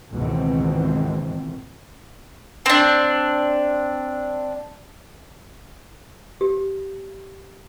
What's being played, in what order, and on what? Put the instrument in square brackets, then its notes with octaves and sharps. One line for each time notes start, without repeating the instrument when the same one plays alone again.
[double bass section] C#2 G#2 B2 D#3 E3 C4
[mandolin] C4 D4
[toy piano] G4